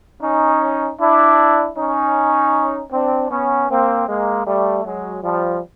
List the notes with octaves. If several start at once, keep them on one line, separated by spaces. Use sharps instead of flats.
C#4 D#4
D4 E4
C#4 D#4
C4 D4
B3 C#4
A#3 C4
G#3 A#3
G3 A3
F#3 G#3
F3 G3